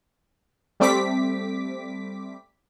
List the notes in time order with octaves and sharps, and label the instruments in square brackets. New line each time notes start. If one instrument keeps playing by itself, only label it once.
[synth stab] G3 A3 C4 D6 B6